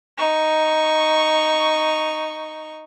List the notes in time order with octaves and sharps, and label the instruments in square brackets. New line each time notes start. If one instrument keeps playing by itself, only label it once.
[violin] D#4 C#6